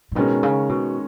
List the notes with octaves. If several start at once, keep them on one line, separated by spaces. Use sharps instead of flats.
A#2
B2 D#3 G#3 C#4
C#3
B2